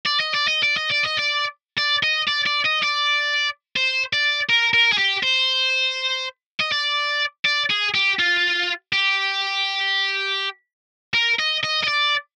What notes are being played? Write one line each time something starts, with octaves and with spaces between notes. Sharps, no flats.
D5
D#5
D5
D#5
D5
D#5
D5
D#5
D5
D5
D#5
D5
D5
D#5
D5
C5
D5
A#4
A#4
G#4
G4
C5
D#5
D5
D5
G#4
G4
F4
G4
A#4
D#5
D#5
D#5
D5